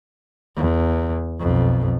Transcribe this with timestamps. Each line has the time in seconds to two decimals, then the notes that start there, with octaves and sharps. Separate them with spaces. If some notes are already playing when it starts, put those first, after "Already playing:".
0.56 E2
1.40 B1 F2